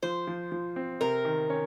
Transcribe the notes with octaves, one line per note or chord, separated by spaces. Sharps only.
F3 C5
F3
F3
C4
C3 A#4
D#3
C#4